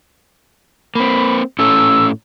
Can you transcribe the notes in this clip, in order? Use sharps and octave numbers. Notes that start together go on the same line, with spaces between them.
A#3 C4 B5
A2 C#4 A4 E6